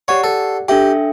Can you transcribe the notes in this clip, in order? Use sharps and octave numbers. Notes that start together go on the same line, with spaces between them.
G4 C#5 D5 F#5
A4
D4 G4 A4 E5 G5